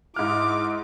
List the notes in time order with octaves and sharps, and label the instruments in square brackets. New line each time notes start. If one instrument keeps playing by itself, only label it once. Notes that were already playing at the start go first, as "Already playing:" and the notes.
[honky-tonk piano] G#2 F6 [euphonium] E4 [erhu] D6